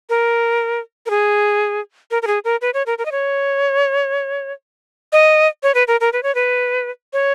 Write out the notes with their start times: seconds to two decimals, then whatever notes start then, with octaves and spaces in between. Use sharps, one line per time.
0.09 A#4
1.06 A#4
1.10 G#4
2.11 A#4
2.22 A#4
2.27 G#4
2.45 A#4
2.61 B4
2.74 C#5
2.86 A#4
2.98 A#4
3.06 D#5
3.12 C#5
5.13 D#5
5.63 C#5
5.75 B4
5.88 A#4
6.01 A#4
6.13 B4
6.23 C#5
6.35 B4
7.13 C#5